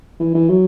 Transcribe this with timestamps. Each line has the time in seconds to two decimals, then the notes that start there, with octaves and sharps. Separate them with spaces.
0.20 E3
0.35 E3
0.49 F#3